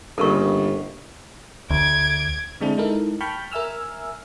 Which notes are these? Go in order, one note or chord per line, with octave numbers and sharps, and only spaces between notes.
G1 C#3 G3 A#3 A4 A#4 C#6
D2 D6 G#6
D3 G#3 C4 D4 E4
G#3 D#4 E4 A4 A#4
G5 A5 B5 C#6 F6 G6
A#4 E5 G#5 E6 F6